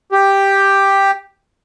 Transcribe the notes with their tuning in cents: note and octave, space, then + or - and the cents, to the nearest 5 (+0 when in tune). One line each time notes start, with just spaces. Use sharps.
G4 +5